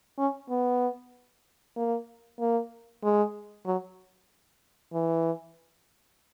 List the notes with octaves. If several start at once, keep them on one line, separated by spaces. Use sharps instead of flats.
C#4
B3
A#3
A#3
G#3
F#3
E3